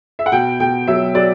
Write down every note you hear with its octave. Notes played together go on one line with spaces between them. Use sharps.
E5
F#5
B2 G5
B2 G5
F#3 E5
F#3 D5